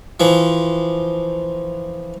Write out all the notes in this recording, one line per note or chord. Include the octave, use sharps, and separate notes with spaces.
E3 F3